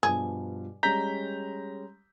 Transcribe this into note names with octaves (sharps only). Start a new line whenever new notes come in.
G2 B2 F3 G#4
G3 G#3 C#4 A#5 G6 B6